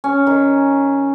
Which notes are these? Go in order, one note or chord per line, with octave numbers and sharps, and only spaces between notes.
C#4
D#3